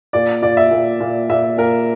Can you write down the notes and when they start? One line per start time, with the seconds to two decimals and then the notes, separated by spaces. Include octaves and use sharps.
0.13 A#2 D5
0.42 A#2 D5
0.57 E5
0.71 A#2
1.00 A#2
1.29 A#2 E5
1.58 A#2 A#4